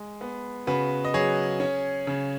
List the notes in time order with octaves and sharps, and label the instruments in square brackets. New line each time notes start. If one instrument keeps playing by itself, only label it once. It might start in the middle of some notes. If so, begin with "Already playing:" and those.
Already playing: [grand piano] G#3
B3
C#3 F#4 B4
D#5
F#3 G#4 C#5
C#4
C#3